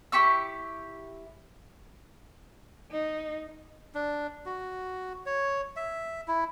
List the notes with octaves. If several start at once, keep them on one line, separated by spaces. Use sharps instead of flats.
E4 G4 C#6 E6
D#4
D4
F#4
C#5
E5
E4